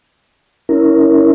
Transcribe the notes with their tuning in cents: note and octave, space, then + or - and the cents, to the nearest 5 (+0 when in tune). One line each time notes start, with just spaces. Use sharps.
C#4 +10 E4 -20 A#4 +0